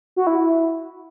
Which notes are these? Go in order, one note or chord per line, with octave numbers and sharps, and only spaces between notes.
F#4
E4